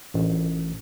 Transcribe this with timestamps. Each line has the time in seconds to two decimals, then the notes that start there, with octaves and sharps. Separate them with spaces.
0.14 A1